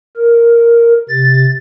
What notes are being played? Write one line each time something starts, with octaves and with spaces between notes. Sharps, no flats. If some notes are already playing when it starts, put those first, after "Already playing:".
A#4
C3 A6